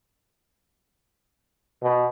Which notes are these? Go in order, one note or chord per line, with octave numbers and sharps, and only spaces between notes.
B2